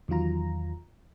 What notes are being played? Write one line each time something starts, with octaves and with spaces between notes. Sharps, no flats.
E2 D#3 F#3 F4 A#5